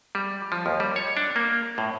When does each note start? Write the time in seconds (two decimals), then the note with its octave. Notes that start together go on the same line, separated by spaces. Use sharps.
0.15 G3
0.52 F3
0.66 D#2
0.80 G3
0.96 C#5
1.17 D4
1.36 A#3
1.78 A2